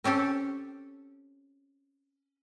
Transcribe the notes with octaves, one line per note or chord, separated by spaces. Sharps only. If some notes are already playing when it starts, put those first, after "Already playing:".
C4 C#4 G4 A4